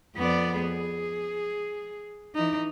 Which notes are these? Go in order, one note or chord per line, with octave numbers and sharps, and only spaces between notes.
F2 B3 D5
G#4
E3 D#4